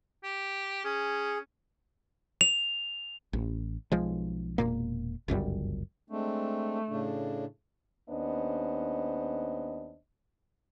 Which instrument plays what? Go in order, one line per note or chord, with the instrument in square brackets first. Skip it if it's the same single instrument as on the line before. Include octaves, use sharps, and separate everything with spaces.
[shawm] G4
[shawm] C#4 [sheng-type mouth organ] G#4
[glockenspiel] F7
[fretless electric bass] A1
B1 F3 G#3
E1 A#2 A#3
G1 C#2 F#2 G3
[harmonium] G#3 C4 D4 [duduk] A3
[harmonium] A2 C#3 D4
[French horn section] D#2 B3 C#4 D4 C5 D#5